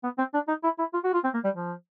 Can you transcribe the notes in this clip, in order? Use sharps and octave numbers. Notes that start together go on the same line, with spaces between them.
B3
C4
D4
D#4
E4
E4
F4
F#4
F4
C4
A#3
G3
F3